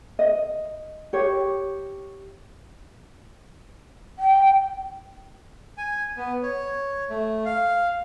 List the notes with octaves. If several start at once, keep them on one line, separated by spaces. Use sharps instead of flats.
D#5
G4 C#5
G5
G#5
B3
C#5
A3
F5